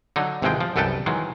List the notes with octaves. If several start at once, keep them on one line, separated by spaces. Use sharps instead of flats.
D3 F#3 D#4
G#1 C3 E3 F3 G#3 G5
F3
C2 F#2 A4 B4 G5 A5
D#3 E3 F#3 G#3